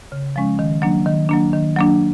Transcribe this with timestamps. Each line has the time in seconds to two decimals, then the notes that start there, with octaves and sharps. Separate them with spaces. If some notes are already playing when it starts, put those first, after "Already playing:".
0.12 C#3
0.36 F3 G#3 C#4
0.59 D#3
0.82 F#3 A#3 D4
1.06 D#3
1.29 F#3 A#3 D4
1.53 D#3
1.77 F#3 A#3 D4